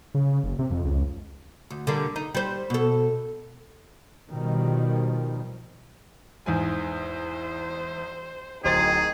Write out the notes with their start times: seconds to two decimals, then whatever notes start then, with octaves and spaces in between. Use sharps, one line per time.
0.14 C#3
0.44 F#1
0.59 C3
0.71 F2
0.84 C#2
1.70 D2
1.87 D3 G3 A#3
2.16 D#4
2.35 G3 C5
2.70 B2 A4
4.30 B2 D#3 F3 G3
6.46 E2 G#2 C5 G#5
8.65 D1 D#3 G#4 C5 A6